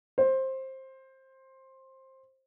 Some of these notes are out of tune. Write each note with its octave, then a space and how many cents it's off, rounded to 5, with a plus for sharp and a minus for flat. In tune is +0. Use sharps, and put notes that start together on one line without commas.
C5 +15